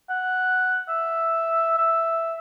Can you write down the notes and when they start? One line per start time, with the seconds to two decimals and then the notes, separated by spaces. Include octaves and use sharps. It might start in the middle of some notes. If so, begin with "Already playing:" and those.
0.10 F#5
0.89 E5
1.78 E5